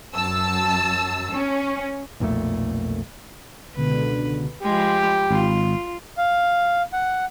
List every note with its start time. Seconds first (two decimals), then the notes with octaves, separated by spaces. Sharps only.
0.14 F#2 A5 E6
1.31 C#4
2.20 B1 F2 A#2 A3
3.76 C#2 B2 D3 B4
4.62 F3 G#3 G4 B5
5.30 G#1 F4
6.18 F5
6.93 F#5